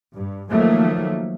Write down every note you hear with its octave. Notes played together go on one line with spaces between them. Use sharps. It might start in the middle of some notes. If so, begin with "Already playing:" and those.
G2
D#3 F3 F#3 A3 A#3